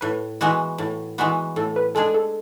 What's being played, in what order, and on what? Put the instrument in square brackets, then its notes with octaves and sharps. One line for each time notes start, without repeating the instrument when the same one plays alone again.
[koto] A2 [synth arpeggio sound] B4
[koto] E3 G#3 B3 F#4
A2
E3 G#3 B3 F#4
[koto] A2 [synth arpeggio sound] A4
[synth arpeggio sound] B4
[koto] G#3 D4 G#4 [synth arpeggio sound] A4
[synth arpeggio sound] A4